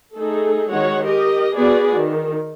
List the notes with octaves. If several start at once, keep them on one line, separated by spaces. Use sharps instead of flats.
A3 D#4 G#4 A4
D#3 G#3 F#4 C#5 F#5
G4 A#4 D#5
B3 F#4 G#4 B4 D5
D#3